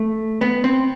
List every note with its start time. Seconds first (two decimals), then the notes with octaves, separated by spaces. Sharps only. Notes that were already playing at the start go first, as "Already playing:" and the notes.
Already playing: A3
0.41 B3
0.64 C4